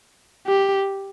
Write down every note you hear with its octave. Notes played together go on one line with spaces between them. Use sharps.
G4